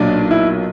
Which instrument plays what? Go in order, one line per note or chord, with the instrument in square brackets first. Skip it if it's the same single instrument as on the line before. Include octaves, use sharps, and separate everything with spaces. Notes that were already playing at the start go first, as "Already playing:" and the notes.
Already playing: [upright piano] B1 A#2 F#3 [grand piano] D4 D5
[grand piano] E4 E5